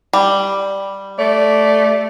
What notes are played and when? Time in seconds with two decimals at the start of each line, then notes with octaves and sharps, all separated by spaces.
0.13 G3
1.19 A3 D5